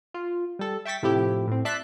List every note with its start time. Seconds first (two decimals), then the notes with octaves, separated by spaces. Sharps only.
0.14 F4
0.59 G3 A4
0.85 E5 G5 C#6 A6 B6
1.03 A2 C3 F3 E4 G4
1.47 A2 C4
1.65 D5 E5 A5 C6 F#6 B6